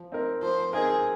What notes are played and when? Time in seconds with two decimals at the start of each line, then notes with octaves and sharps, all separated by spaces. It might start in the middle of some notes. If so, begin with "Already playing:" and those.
Already playing: F3
0.12 C4 D#4 A#4
0.42 F3 C5
0.73 C4 D#4 G#4 A#4